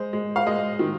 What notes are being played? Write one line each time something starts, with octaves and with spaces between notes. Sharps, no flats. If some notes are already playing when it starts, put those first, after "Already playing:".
Already playing: G#3 C5
G#3
F5
G#3 D#5
D#3